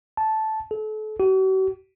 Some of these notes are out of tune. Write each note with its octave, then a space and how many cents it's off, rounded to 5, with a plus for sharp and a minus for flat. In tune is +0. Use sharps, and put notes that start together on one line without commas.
A5 -10
A4 -35
F#4 +45